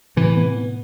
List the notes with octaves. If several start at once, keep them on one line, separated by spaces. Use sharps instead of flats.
A2 C3 E3
B3
B3